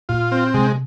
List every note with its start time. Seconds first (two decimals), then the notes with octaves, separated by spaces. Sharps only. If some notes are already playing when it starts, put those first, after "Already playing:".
0.09 A#2 F4
0.32 C4
0.54 C3 G#3